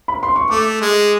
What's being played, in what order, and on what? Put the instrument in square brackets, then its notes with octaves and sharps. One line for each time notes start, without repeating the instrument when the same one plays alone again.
[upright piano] B5
C6
C#6
[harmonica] A3 [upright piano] D6
[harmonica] G#3